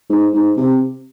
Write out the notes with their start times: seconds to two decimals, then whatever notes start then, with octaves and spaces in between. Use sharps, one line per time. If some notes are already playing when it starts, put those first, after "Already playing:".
0.10 G#2
0.34 G#2
0.57 C3